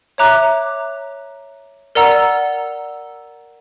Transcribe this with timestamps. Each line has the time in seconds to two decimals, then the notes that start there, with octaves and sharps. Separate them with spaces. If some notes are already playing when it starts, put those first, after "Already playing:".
0.18 C#5 E5 A#5 D6 F#6
1.95 A#4 D5 F#5 A#5 E6